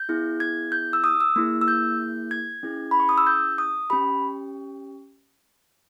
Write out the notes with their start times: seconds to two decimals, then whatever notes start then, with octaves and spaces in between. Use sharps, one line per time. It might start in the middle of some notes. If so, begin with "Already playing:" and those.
Already playing: G6
0.09 B3 E4 G#4
0.40 G#6
0.72 G6
0.93 E6
1.04 D#6
1.20 E6
1.36 A#3 E4 G#4
1.61 E6
1.68 G6
2.31 G#6
2.63 C#4 E4 G#4
2.91 B5
3.00 C#6
3.09 D#6
3.18 E6
3.27 G6
3.58 D#6
3.90 C#4 G4 B5